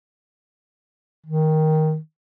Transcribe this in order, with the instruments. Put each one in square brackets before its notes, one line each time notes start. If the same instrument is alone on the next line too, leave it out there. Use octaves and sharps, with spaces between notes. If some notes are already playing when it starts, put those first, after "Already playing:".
[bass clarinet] D#3